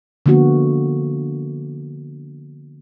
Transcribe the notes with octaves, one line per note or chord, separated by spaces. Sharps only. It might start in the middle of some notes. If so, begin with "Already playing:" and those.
D3 F3 A#3 B3 F#4